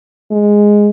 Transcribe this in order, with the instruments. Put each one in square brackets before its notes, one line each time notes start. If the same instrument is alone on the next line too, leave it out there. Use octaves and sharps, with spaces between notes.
[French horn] G#3